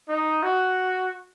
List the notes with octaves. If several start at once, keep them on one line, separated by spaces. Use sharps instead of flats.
D#4
F#4